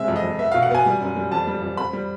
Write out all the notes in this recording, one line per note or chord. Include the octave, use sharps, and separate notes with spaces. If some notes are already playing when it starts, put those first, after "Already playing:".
Already playing: C3 G#3 E5
F2
D#5
F2
B3 E5
B2 F5
F#5
B3 G#5
G3
F#2
G3
F2 A5
G3
F2
C4 B5
G3